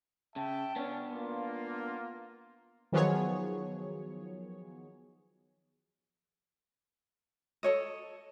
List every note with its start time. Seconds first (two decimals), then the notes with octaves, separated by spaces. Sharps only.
0.36 C#3 E5 G5 A5
0.76 B3 C#4 D4
1.11 A#3 F4
2.92 D#3 F3 F#3 B3 G#4 C#5
7.63 A4 C#5 D#5